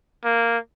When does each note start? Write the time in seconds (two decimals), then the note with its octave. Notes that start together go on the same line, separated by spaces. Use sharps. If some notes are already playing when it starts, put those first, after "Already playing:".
0.24 A#3